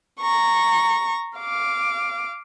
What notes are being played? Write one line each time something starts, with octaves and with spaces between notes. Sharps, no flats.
A#5 C#6
F5 D6